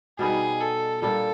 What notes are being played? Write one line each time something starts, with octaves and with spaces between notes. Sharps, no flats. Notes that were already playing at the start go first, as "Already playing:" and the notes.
B2 G3 B3 D#4 G#4
A4
A#2 G3 A#3 D4 A4